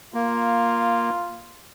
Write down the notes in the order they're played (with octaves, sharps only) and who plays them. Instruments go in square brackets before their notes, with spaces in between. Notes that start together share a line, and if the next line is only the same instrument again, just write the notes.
[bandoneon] A#3 [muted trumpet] F4